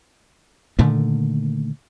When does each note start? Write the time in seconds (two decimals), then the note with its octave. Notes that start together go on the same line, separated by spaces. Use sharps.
0.79 A#2 D3 D#3 A3